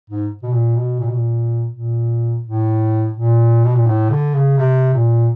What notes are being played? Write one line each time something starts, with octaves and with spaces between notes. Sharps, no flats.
G#2
B2
A#2
B2
A#2
B2
A#2
A#2
A2
A#2
B2
A#2
A2
D3
C#3
C3
A#2